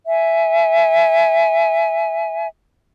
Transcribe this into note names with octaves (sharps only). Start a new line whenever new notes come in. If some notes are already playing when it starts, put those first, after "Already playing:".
E5 G#5